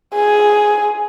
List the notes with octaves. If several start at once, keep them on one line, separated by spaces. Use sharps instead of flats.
G#4